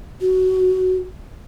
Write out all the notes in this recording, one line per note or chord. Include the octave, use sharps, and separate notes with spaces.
F#4